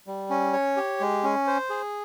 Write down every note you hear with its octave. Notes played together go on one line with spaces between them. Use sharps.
G3
C#4
C#5
G4
G#3
C#4
C5
G#4